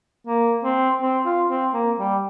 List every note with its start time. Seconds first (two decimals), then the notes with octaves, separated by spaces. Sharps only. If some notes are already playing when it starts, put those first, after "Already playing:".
0.27 A#3
0.63 C4
1.01 C4
1.25 F4
1.49 C4
1.74 A#3
1.99 G3